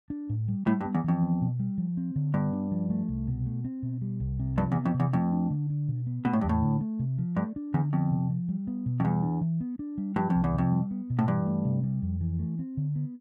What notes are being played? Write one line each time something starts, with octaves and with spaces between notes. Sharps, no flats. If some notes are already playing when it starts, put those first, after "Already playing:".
D4
A2
G3
A2 G3
G2
B3
E2
F2 E3
B3
B2
G3
F3
C4
D3
G2 B3
D4
F3
A3
C2
B2
A3
C4
B2
G3
C2
C3
G2 F3
E2
B3
F2
C3
E2
F2 A3
D4
D3
D4
B2
B3
B2 A3
A2
G2
E2
A2
D3
A3
C3
F3
G2 A3
D4
E2 D3
F2 B3
C3
F3
G3
B3
B2
F2
E2 G3
D4
E3
B3
D4
G3
G2 F3
C2 F2
E2
F2 C3
G3
B3
B2
A2
G2 E3
A3
C3
G3
F2
E3
A3
C4
D3
B3